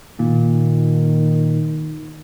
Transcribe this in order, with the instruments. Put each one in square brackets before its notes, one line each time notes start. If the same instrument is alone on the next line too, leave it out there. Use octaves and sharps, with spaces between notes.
[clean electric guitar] A#2 [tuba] D#3